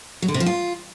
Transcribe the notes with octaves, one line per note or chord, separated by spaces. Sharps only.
F#3
D3
C3
F3
F4